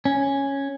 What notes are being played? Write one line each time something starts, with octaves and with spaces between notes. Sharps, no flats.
C#4